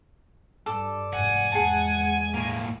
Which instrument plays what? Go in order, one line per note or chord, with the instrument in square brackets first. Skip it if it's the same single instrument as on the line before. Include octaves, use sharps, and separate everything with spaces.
[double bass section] G2 [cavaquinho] A4 D5
[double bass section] F1 G#2 [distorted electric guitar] F#5 [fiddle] G#5
[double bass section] E2 G#3 [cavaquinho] G#4 A5
[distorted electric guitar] A2 A#3